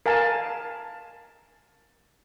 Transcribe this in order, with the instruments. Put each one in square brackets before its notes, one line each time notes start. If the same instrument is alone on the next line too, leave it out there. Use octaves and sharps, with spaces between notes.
[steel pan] A#4 F5 G#5 A5